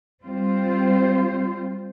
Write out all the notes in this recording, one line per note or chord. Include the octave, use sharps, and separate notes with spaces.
G3 C4 F4 C5